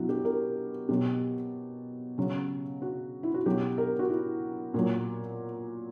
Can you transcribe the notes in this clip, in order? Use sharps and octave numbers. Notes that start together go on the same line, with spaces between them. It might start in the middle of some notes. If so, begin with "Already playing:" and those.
Already playing: B2 F#3 D4 E4 F#4
G4
A#4
B2 F#3 G4
C#3 F#3
F#4
E4
F#4
B2 F#3 G4
A#4
F#4
E4
A#2 F#3